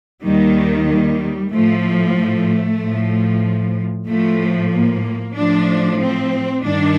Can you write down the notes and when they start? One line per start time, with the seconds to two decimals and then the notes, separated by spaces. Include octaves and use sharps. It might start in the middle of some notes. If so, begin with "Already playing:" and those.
0.24 D#2 D#3 G3
0.88 G3
1.52 A2 F3 A3
2.16 A3
2.80 A2 F3
4.08 A2 F3 A3
4.72 A#3
5.36 A2 F3 D4
6.01 C4
6.64 G2 D#3 D4